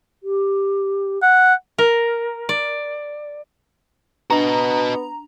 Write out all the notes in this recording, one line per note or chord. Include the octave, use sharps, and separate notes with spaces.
G4
F#5
A#4
D5
B3 D4 F#4 D#5 A#5